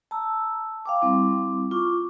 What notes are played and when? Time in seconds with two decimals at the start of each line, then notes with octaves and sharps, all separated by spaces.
0.11 A5 A#5 E6
0.86 F5 G5 D6
1.02 G3 C4 E4 D6
1.71 F4 C#6 D6